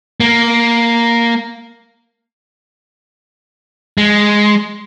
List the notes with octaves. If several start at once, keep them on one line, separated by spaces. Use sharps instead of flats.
A#3
G#3